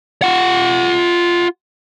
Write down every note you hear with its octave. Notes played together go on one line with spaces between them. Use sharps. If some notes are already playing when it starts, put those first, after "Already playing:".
F4 F#5